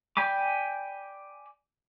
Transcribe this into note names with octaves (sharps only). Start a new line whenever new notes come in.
D5 G5 G#5 B5 D6